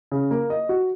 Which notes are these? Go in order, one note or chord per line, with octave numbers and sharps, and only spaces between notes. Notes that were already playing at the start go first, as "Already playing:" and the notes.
C#3
A#3
D#5
F#4